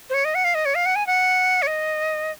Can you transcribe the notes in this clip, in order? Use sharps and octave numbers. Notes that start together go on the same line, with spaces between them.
C5
C#5
D#5
F#5
F5
D#5
C#5
F5
F#5
G#5
F#5
C#5
D#5